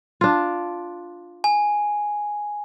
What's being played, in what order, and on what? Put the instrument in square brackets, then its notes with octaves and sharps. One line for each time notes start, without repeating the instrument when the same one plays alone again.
[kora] D4 F4
[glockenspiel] G#5